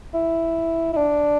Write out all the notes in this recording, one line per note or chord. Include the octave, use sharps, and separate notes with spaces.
E4
E4
D4